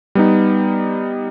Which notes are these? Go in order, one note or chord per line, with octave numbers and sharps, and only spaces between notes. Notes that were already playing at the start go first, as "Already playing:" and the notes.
G3 B3 D#4